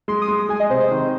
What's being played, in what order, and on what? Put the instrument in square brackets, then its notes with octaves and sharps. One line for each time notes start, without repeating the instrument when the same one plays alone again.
[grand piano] G#3 [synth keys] C6
[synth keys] D#6
[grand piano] G#3
[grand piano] G#3 [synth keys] G#5
[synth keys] D#5
[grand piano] C3 [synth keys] C5
[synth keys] C5
[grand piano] D#3